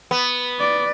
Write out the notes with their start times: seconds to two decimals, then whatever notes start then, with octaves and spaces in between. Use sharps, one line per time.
0.11 B3
0.60 D5